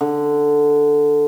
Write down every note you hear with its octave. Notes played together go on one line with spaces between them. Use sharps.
D3